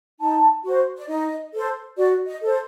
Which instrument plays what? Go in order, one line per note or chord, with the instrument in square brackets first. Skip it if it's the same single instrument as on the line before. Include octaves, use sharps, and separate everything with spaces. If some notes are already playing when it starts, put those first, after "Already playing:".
[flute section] D#4 A5
F#4 C5
D5
D#4 D#5
A4 C5
F#4 D5
D#5
A4 C5